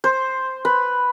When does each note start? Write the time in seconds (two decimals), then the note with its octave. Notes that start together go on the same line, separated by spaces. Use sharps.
0.04 C5
0.65 B4